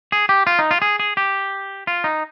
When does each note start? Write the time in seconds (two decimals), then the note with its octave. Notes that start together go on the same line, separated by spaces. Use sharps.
0.12 G#4
0.29 G4
0.47 F4
0.59 D#4
0.71 F4
0.82 G#4
1.00 G#4
1.17 G4
1.87 F4
2.04 D#4